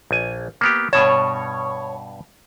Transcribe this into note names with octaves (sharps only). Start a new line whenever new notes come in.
A#1 G#5
A#3 B3 G4
G2 B2 C#5 A5